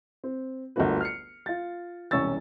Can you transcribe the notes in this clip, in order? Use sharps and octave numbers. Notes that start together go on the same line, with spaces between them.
C4
G1 D2 D3 A#3 F#4 B4
F6 C7 C#7
F4 A6
E1 C2 C#4 C#6 E6 A6